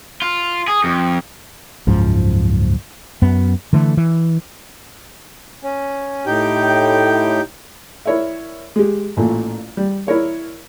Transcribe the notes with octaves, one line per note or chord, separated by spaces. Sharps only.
F4
G#4
F2
F#1 C#2 G#2 F3
F#2 B3
D3 E3 A3
E3
C#4
A2 D#4 G4 G5
E4 A#4 C#5 D5 E5
G#3 G4
A1 A#2 A3
G3
E4 A#4 C#5 D5